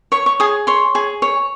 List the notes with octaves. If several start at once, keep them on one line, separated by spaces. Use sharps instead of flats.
C#5 C#6
C#6
G#4 D#6
C#5 C6
G#4
C#5